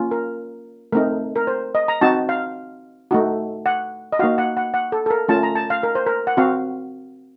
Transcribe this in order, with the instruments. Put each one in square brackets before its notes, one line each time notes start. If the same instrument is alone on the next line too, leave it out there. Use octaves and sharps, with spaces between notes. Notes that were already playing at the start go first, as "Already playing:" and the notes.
Already playing: [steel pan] A#3 C#4 F4
A#4
A3 C4 D#4 A#4
A#4
C5
D#5
A#5
C4 D#4 F#4 A5
F5
A3 D#4 F#4
F#5
D#5
A#3 D#4 F#4 F5
F#5
F#5
F#5
A4
A4
A#4
A3 C#4 F4 A5
A#5
A5
F5
A#4
C5
A#4
F#5
C4 F#4 F5